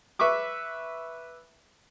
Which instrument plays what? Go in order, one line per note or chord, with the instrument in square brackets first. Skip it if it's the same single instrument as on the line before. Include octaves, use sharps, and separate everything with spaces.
[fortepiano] B4 E5 C#6 D6